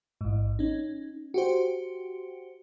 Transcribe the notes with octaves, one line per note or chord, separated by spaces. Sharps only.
A1 G#2
C#4 D#4
F#4 G4 C5